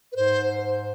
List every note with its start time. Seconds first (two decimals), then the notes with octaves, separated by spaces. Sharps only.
0.12 B4
0.16 G#2 C5